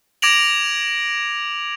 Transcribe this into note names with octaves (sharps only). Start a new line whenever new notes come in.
D6 G#6 A#6 D7 F7 F#7